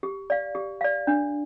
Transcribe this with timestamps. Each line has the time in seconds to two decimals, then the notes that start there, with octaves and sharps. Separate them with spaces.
0.03 G4
0.30 D5 F5
0.55 G4
0.81 D5 F5
1.07 D4